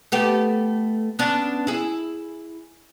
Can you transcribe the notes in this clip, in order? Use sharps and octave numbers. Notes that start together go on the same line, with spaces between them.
A3 B3 G4
B3 C#4 D4
E4 G#4